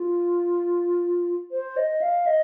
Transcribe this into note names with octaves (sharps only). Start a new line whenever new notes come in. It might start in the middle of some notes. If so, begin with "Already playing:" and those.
Already playing: F4
C5
D#5
F5
D#5